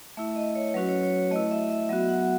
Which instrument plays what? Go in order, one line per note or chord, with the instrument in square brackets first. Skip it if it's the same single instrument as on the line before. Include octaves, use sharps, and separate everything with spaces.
[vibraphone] A3 E4 E5
D#5
C#5
F#3 C#4 F#4 B4
C#5
C#5
A3 E4 D#5
E5
E5
F#3 B3 F#4 E5
F#5